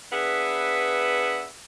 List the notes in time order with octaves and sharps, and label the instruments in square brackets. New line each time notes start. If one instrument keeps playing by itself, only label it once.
[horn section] B3 D4 G#4 B4 E5